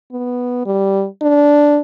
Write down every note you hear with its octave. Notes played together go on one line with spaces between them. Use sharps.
B3
G3
D4